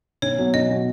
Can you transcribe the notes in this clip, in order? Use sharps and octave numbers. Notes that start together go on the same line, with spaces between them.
B1 C#5
B2 F#3 B3 F#4
B1 D#5
B2 F#3 B3 F#4